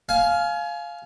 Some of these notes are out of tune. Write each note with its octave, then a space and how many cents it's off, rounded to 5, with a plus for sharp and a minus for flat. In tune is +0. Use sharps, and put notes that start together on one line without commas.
F5 +0 G#5 +30